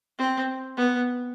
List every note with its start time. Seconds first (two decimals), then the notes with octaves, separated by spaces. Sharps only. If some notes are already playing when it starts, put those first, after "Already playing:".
0.19 C4
0.77 B3